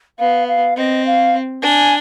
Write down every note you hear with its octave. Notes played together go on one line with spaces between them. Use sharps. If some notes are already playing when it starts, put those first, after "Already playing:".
B3 F5
F5
C4 D#5
F5
D4 G#5